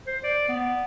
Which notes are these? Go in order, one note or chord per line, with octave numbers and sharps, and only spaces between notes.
C5
D5
B3